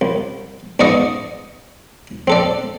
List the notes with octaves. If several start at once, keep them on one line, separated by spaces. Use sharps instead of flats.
C2
E2 G#2 D5 D#5 C#6 D#6
C4 A4 D5